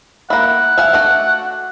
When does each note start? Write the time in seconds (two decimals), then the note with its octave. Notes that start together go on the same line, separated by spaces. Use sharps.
0.30 A#3 E4 F#5
0.78 E5 F5 G#5
0.93 A3 D4 F#4